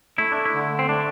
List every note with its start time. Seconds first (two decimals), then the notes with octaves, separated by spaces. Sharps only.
0.18 A3 E4
0.32 D4
0.45 E4
0.54 D3
0.79 C4
0.89 A3 D4